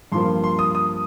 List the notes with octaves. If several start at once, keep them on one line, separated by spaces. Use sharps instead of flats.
G2 F3 A#3 C6
C6
D#6
D#6